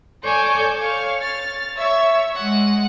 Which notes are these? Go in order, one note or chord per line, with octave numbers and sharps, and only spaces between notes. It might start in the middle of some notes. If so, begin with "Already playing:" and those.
A4 C#5 D5 G#5 C#6 G6
C#5 F5
F6 A6
C#5 E5 E6
G#3 F#5